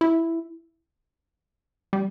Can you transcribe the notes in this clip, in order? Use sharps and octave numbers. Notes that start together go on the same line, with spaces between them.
E4
G3